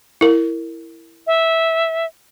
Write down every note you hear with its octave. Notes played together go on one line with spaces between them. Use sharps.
E4 A#4
E5